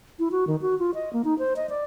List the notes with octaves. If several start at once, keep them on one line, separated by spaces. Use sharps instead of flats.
E4
F#4
D#3
F#4
F4
D#5
A#3
D#4
C5
D#5
D5